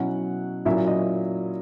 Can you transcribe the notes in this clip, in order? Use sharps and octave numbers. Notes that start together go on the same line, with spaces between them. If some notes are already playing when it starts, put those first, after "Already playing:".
Already playing: B2 F#3 C#4 E4 F#5
A#2 F#3 C#4 E4 E5
D#5